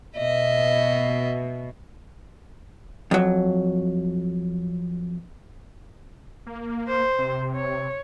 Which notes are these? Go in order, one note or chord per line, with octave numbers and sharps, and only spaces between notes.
B2 D#5 E5
F2 F#3
A#3
C5
C3
C#5